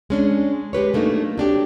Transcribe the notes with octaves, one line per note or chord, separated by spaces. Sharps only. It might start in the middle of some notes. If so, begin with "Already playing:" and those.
G#3 C#4 D4
G#3 G4 B4 C#5
F#3 A3 A#3 D4 D#4
F#3 D4 G4